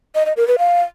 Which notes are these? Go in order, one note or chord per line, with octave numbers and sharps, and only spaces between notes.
D#5
D#5
A#4
B4
F5